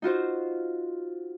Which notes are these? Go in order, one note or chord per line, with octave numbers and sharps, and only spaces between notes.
D#4 F4 F#4 C5